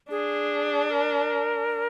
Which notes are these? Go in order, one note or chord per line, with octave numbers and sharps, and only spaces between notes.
D4 G#4
A#4